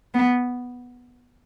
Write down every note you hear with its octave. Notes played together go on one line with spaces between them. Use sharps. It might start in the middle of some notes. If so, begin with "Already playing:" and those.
B3